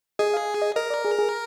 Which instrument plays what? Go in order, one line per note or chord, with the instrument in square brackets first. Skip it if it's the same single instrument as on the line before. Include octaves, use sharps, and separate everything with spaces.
[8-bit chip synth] G#4 [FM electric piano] D#5
[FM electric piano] F5
D#5
[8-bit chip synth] A#4 [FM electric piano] D#5
[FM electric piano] D5
G#4
G#4